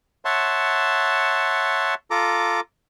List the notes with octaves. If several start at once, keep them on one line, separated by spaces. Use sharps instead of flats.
C#5 E5 F#5 A5 C6
F4 A4 A#5 D6